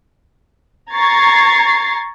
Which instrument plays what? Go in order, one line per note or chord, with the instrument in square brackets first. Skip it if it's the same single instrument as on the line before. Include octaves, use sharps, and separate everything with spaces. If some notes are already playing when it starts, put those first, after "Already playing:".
[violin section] A#5 C#6 G#6 A6 C7